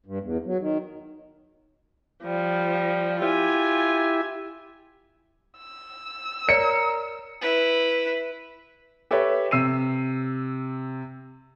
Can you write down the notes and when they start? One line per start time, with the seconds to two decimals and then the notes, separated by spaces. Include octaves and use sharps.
0.06 G2
0.22 E2
0.46 F#3
0.60 D#3
2.22 F3 G3
3.19 E4 F4 G4 E5 G#5
5.58 E6
6.49 A#4 C#5 D5 C#7
7.41 E4 B4
9.11 G4 A4 B4 C#5 E5
9.51 C3 E6 C7 D#7